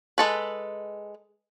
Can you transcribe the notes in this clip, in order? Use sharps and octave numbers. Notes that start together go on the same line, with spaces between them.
G#3 A4 B4